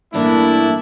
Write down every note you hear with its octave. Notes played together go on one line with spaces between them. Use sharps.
G2 E3 A3 A#3 D4 E4